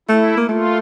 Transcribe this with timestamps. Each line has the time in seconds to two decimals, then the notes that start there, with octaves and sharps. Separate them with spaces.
0.09 A3 E4
0.37 A#3
0.49 A3 F4